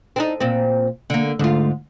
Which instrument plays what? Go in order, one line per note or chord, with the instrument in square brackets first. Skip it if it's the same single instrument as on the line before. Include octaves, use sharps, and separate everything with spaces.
[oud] C4 D4 D#4
A#2 C4
D3 A#3
[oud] G#2 F4 [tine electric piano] D3 A3